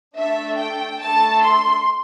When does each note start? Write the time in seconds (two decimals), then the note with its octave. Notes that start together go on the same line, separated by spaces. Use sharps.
0.17 A3 D4 A4 E5
0.59 G5
1.01 A3 D4 A4 A5
1.42 C6